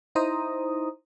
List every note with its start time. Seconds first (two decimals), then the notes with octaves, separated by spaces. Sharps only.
0.15 D#4 E4 C5 A#5 D#6